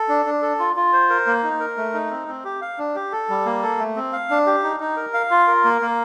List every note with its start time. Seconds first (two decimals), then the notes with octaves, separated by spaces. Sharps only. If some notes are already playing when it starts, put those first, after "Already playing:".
Already playing: A4
0.09 D4
0.26 D4
0.42 A4
0.59 F4
0.76 F4
0.93 C5
1.10 A#4
1.27 A#3
1.43 D#4
1.60 A#4
1.77 A3
1.94 D#4
2.11 C4
2.28 C4
2.44 G4
2.61 F5
2.78 D4
2.95 G4
3.12 A4
3.29 G3
3.46 A#3
3.63 A4
3.79 A3
3.96 C4
4.13 F5
4.30 D4
4.46 G4
4.63 D#4
4.80 D#4
4.97 A#4
5.14 F5
5.31 F4
5.48 A#4
5.64 A#3
5.82 A#3